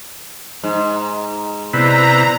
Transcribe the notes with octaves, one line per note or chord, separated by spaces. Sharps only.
G#2
A#5
C3 B3 E4 B4 D5 A#5